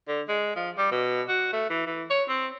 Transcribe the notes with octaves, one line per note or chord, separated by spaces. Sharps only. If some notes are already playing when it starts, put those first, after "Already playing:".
D3
G#3
F3
G3
B2
F#4
A3
E3
E3
C#5
C4